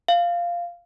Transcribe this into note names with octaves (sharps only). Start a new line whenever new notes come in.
F5